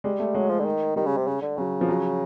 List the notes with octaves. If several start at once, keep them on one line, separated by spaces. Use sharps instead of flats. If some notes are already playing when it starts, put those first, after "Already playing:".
G3 G#3
A3
F#3 G#3
F3
D3
D#3
D#3 G3
C#3
C3
C#3
D3
C#3 F#3
F3
F#3